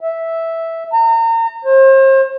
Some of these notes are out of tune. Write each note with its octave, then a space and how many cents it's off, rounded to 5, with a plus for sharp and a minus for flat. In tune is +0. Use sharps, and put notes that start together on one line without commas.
E5 -5
A#5 -35
C5 +40